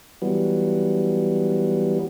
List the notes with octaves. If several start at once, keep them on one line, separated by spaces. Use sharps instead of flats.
E3 F#3 G3 B3